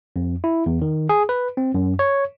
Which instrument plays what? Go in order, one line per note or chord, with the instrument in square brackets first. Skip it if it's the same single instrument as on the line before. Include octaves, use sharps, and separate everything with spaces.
[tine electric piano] F2
E4
E2
D#3
G#4
B4
C4
F#2
C#5